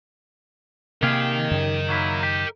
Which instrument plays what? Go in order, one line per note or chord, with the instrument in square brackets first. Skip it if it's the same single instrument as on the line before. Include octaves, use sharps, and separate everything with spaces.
[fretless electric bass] C3 A#3 [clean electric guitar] G4 G#4 F5 [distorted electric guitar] A#4 D#5
[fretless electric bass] F#2 C#3
[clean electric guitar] F#3 A#3 E4
G4